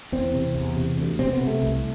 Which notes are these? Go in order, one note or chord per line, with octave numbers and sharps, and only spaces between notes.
E2 C4
C3
E2
C3
D2
C3 C4
B3
C3
A3
C2